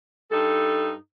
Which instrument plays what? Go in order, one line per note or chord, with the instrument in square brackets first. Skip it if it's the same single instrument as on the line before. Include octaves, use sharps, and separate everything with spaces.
[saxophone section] G2 D#4 A4